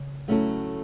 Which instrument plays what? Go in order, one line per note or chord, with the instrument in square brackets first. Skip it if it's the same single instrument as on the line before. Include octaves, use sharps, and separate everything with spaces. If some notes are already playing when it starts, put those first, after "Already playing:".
Already playing: [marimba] C#3
[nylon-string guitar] F#3 A3 C#4 E4 A4